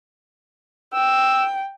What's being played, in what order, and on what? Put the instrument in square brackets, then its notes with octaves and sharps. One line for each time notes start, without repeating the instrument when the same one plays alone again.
[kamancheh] G5 [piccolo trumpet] E6